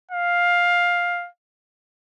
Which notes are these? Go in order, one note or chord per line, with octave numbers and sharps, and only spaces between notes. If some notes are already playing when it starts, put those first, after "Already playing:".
F5